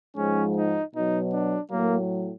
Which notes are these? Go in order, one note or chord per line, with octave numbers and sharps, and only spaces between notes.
G#2 F3 G#3 C#4
D#4
B2 F#3 D#4
D4
A2 F#3 A#3